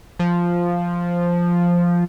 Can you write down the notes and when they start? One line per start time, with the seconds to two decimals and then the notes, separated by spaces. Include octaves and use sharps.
0.19 F3